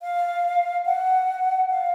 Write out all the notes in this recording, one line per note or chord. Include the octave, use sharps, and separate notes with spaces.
F5
F#5
F5